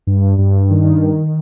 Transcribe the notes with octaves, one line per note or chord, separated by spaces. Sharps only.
G2
G2
D#3